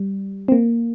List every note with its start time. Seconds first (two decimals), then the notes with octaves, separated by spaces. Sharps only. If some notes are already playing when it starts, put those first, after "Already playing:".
Already playing: G3
0.48 C4
0.52 A#3